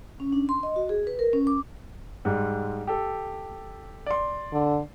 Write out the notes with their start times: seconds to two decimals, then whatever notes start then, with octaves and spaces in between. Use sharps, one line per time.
0.20 C#4
0.33 D4
0.49 C6
0.63 D#5
0.76 F#4
0.89 G#4
1.07 B4
1.19 A#4
1.33 C#4
1.47 D6
2.25 G#2 G3 G#3
2.87 G4 A4
4.06 D5 C6
4.53 D3